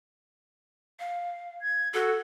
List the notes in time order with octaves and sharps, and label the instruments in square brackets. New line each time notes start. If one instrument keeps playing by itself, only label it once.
[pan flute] F5
[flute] G#6
[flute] F#4 [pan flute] A4